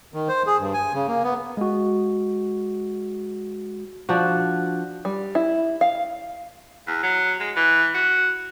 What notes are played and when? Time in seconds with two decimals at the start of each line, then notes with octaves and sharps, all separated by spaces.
0.14 D#3
0.28 C5
0.47 G#4
0.58 G2
0.74 G#5
0.93 C#3
1.07 A#3
1.23 B3
1.57 G#3 F#4
4.09 F3 D4 F#4
5.05 G3
5.35 E4
5.81 F5
6.87 E2
7.03 F#3
7.40 G#3
7.56 E3
7.95 F#4